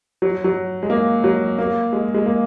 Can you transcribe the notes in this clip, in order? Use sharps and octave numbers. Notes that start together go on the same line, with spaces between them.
F#3
F#3
G#3
A#3
F#3
A#3
G#3
G#3
A#3